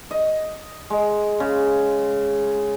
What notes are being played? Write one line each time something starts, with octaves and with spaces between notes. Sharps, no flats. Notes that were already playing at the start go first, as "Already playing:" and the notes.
D#5
G#3
C#3